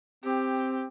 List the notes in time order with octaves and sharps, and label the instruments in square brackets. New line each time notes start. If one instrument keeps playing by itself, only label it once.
[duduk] C4 [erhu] G4